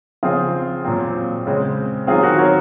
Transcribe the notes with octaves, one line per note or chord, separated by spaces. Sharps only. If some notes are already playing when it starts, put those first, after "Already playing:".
C#3 F3 C4 F4 G#4
A#2 F#3 C4
C#3 G#3 C4
D#3 F#3 C4 F4 G#4
F#4 A#4
A#4 C#5